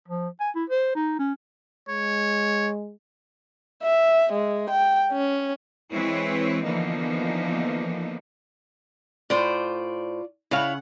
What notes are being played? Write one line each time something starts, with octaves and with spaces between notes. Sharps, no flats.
F3
G#5
E4
C5
D#4
C#4
G#3 C#5
E5
G#3
G5
C#4
E3 G#3 C4 E4 B4 C#5
D3 E3 F3 A#3 B3 D#4
A2 F4 C5 D5
C#3 E4 C#5 F5 F#5